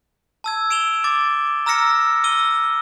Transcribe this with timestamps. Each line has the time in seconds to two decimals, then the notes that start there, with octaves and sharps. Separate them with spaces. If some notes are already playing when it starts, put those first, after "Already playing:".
0.44 A5 E6 G#6
0.70 D7 E7 F7 G7
1.04 D6 A6
1.66 A#5 E6 F6 A#6 C#7
2.24 E6 D#7 G7